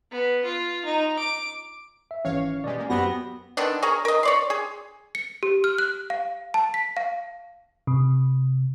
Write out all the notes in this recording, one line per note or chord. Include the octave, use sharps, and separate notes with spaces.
B3
F4
D#4
D6
E5
G#1 E3 C#4 C#5 F5
B2 G#3 G4 D5 G#5
A#3 C#4
F#2 B3 C4 F#4 G4 A#6
D3 D#3 B3 D4
G#4 A#4 C#5 A#5
A#4 D#5
C#5 D5 C6
G#4
C#7
G4
F6
F#6
F5
A5
B6
F5
C3